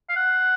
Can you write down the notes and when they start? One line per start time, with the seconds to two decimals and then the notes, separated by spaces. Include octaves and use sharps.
0.09 F5
0.16 F#5